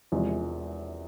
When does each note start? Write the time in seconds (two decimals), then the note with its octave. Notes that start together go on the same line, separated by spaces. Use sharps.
0.12 E1 E2 C3 F3 G#3